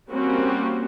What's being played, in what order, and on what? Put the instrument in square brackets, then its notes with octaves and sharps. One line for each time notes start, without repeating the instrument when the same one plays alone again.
[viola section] G3 A#3 C4 C#4 F#4